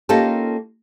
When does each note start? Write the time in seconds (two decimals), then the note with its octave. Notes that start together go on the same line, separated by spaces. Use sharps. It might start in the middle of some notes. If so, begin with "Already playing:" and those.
0.09 A#3 C#4 D#4 F4 G4 A4